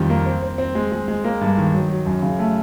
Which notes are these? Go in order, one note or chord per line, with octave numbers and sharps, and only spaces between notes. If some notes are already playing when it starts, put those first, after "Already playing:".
Already playing: F2 D#3 G3
A#3
C4
C4
C4
G#3
G#3
G#3
A#3
G2
D#3
F#3
F#3
F#2
C#3
A3